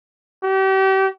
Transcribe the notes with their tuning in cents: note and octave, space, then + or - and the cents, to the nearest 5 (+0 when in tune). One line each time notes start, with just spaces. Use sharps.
G4 -35